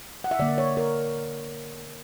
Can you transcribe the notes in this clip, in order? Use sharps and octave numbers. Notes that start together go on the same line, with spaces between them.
F#5
E5
D3 A#3 D5
C#5
A#4